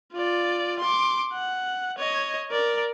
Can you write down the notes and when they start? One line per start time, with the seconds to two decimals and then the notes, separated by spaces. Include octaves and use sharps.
0.13 F4 D5
0.80 C6 D6
1.33 F#5
1.98 C#5 D#5
2.51 A#4 D5